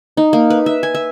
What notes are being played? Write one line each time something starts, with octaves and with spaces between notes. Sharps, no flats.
D#4
A#3
B4
E5
G#5
E5